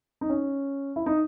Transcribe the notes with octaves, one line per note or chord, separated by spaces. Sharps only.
D#4
C#4
E4
D#4